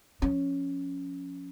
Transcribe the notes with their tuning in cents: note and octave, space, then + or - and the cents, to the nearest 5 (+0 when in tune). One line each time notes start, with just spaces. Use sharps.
F3 +20 C#4 +0